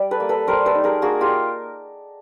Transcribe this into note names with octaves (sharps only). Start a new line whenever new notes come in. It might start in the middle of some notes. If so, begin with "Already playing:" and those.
Already playing: G3 D5
A4 B4
A#3
A4 B4
G3 A#4 C5
A4 B4
D#4
G#4 A#4
A#3 F#4 G#4
F4 G4